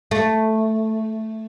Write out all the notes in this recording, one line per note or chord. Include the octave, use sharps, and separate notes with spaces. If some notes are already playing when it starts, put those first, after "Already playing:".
A3